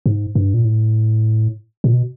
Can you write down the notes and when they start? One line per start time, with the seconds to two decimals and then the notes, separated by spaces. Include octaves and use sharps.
0.06 G#2
0.35 G2
0.54 A#2
0.65 A2
1.84 A#2
1.93 B2